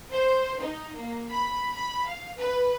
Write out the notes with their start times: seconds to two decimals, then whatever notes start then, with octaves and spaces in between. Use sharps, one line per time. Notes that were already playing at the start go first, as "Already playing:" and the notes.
0.13 C5
0.59 D#4
0.97 A#3
1.31 B5
1.74 B5
2.06 F5
2.39 B4